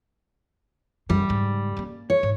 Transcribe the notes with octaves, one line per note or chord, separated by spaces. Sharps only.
F#2 G3
G#2 C#3
A#3 C#4
C#5
G#2